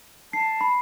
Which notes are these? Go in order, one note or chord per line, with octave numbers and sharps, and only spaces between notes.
A5 C7
B5